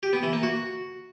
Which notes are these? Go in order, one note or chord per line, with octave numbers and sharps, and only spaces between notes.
G4
B3
E3
A#3
F#4